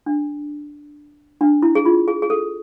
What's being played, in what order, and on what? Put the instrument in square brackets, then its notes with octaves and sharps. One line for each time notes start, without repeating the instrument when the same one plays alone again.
[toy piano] D4
D4
E4
G#4
F4
G#4
G#4
A4